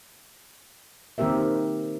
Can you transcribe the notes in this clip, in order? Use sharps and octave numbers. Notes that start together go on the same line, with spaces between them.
D#3 A#3 C4 G4 A#4 E5